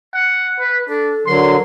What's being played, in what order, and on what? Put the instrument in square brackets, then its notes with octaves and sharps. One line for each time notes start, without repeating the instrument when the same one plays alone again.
[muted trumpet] F#5
B4
[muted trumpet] D4 [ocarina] A4
[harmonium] D3 F#3 [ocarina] A#4 [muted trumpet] C6